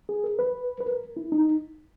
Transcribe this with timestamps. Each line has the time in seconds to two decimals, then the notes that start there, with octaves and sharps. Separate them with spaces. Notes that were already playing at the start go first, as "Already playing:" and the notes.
0.09 G#4
0.24 A#4
0.39 B4
0.80 B4
0.86 A#4
1.17 E4
1.32 D#4